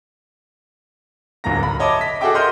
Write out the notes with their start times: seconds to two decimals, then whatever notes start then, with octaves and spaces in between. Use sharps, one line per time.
1.44 D1 C2 G2 A#5 A#6
1.63 B5
1.80 C#5 D#5 E5 A5 D6
2.01 B6
2.21 F#4 G#4 A4 E5 G5 D6
2.34 A#4 D#5 C6 F6 G6